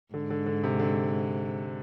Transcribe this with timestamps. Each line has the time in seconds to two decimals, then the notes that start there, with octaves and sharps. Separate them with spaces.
0.14 G#2 D3
0.30 D3
0.46 D3
0.63 C3
0.79 D3